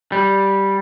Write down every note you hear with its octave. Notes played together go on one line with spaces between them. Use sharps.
G3